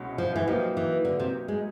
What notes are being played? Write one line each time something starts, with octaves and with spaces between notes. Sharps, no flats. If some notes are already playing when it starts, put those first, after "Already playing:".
Already playing: C2 B2 G#3 C#4 F#4
F3
E3
F3 F#3 A#3 D#4 G4
E3
D3
C3
G#3